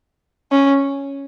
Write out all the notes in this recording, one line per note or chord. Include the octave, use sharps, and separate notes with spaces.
C#4